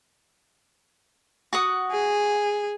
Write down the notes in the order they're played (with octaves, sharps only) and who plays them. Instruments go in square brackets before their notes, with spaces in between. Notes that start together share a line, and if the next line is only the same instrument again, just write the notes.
[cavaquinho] F#4 F#5 D#6
[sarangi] G#4